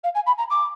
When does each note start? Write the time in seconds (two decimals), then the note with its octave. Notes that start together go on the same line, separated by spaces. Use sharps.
0.04 F5
0.15 G#5
0.26 B5
0.38 A#5
0.50 D6